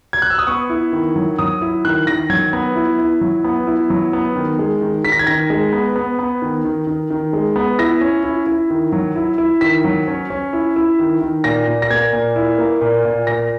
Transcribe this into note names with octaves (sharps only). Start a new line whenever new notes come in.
G#6
F#6
E6
D#6
B3 C#6
E4
D#3
F#3
F#3 D#6
E4
D#3 F#6
D#3 A#6
F#3 G#6
B3
E4
E4
F#3
B3
E4
F#3
B3
D#3
G#3
D#3
D#3 B6
A#6
G#6
D#3 A#6
G#3
B3
B3
B3
D#3
D#3
D#3
D#3
G#3
B3
E4 A#6
C#4
E4
E4
D#3
F#3
E4
E4
D#3 B6
F#3
C#4
C#4
E4
E4
D#3
D#3
A#2 A#6
A#2
A#6
A#3 G#6
A#2
E4
A#3
A#2
A#2
A#2 A#6